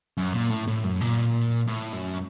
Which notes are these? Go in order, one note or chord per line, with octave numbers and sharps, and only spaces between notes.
F#2
A#2
A2
A2
F#2
A#2
A2
F#2